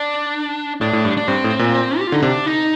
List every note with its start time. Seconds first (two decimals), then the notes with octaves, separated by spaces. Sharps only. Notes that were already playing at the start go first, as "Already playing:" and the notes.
Already playing: D4
0.81 A2 D4
0.93 A2
1.05 G2
1.17 D4
1.28 G2 C4
1.44 A2
1.59 A#2
1.99 G4
2.07 F4
2.12 D3 D#4
2.22 C3 D4
2.46 D#4